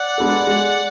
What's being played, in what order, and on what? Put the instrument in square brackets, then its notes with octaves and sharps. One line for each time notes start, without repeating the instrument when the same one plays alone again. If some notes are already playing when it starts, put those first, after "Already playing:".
Already playing: [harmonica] D5 F#5
[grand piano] G#3 B3 D4 A4
G#3